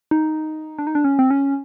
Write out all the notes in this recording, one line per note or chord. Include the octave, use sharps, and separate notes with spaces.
D#4
D4
D#4
D4
C#4
C4
C#4